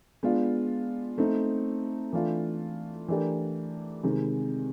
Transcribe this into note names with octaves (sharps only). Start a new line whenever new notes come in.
G#3 B3 D4 F4
A3 C4 D#4
E3 A3 D4 F4
E3 A3 D4 G4 A#4
C3 D#3 G#3